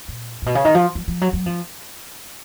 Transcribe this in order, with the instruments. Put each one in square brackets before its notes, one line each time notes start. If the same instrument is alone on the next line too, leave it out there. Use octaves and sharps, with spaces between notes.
[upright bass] A#2
A#2
B2
C#3
D#3
F3
F3
F3
F#3
F#3
F3